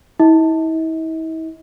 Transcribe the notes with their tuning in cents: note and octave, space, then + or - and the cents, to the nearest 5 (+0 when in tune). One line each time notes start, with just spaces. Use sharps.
E4 -40 D#5 +45